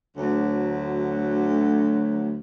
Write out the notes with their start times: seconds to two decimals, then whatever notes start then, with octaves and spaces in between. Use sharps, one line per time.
0.17 D2 F#3